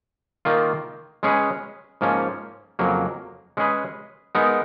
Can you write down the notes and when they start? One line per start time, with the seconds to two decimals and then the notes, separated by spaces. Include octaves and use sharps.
0.45 D#3 A#3 F4
1.23 G#3 C#4 G#4 B4
2.01 G#2 F3 A#3 C#4
2.79 F2 C#3 F#3 A#3
3.57 G#3 C#4 G#4 B4
4.35 G#3 B3 D#4 A#4